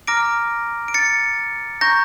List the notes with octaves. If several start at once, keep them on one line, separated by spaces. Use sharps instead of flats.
A#5 D6 F6 A#6 D7
D7
A6 C#7
A#5 C#6 G6 A#6